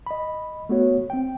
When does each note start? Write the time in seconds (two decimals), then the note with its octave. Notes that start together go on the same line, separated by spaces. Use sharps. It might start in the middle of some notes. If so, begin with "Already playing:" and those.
0.06 D#5 B5
0.69 A3 B3 F#4 C#5
1.10 C4 G5